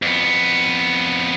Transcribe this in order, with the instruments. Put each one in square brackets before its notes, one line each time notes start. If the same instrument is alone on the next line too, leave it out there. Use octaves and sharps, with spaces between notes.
[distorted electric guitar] F2 B3